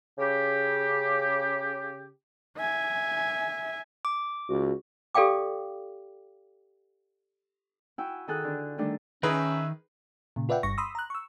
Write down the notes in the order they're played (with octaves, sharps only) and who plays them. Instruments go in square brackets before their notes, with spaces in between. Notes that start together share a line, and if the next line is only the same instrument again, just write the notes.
[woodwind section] C#3 G4
[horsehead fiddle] E5 G#5
[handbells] D6
[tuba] C#2 [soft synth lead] F#4
[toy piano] G4 A4 D5 F5 G5 D6
[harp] E4 F#4 G5 G#5 E6
D#3 G#4 A4 G#5 D#6 F#6
D3 D4
D#3 G3 A3 D4
[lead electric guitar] D#3 [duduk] C#4 [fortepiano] D#4 G#4 B4 [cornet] E5
[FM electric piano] A#2 C#3
F4 B4 D5 E5 F#5 G5
G1 G2 C#6 A#6
B5 C6 D#6 E6
A#5 F#6
C#6 E6